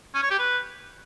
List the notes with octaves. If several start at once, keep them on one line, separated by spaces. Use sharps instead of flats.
C#4
C#5
G4
B4